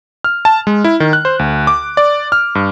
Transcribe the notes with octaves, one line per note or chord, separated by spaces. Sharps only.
F6
A5
G#3
E4
D#3
F#6
C5
D2
D6
D5
F6
G2